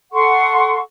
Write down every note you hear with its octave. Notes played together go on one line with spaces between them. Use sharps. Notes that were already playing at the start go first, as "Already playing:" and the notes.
A4 F#5 C6 C#6